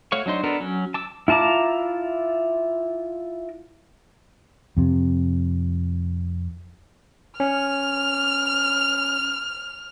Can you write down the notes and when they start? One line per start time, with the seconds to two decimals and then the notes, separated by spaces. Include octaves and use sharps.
0.12 A3 F#4 C#5 F5 C#6
0.26 F#3 D4 D#4 C5
0.44 B3 D4 A4 A#4
0.60 F#3 C#4
0.94 A5 D6 E6
1.28 E4 F4 A5 A#5 D6
4.77 F2 C3
7.40 C#4 F6